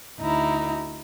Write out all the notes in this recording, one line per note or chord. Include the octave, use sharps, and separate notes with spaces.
D2 D#4 E4 A#5